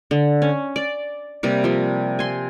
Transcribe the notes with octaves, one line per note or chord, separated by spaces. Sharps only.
D3
C#4
D5
C3 G3 A#3
F3 G3
G#5 C6